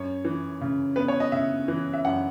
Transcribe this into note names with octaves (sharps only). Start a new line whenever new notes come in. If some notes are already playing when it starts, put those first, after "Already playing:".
Already playing: F#2 C#5
E3
C#3
B3 B4
C#5
D#5
C#3 E5
E3
E5
F#2 F#5